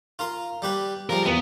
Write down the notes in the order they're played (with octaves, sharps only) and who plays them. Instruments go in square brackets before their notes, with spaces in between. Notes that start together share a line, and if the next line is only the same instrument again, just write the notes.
[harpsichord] F4 A#4 C6
G3 G4 B4
[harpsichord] F3 G3 G#3 [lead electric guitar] A#4
[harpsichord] E2 [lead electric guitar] B3